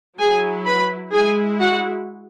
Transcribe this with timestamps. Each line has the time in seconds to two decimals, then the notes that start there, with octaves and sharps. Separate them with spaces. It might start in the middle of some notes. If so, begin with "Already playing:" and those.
0.19 F#3 E4 G#4 G#5
0.65 B4 B5
1.13 G#3 E4 G#4 G#5
1.60 F#4 F#5